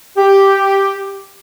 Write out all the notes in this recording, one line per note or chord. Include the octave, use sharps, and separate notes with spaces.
G4